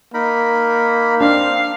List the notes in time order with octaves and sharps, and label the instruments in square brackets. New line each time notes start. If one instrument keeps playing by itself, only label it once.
[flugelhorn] A#3 [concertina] D#4 A#4 B5
[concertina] C4 [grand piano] D4 [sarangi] F5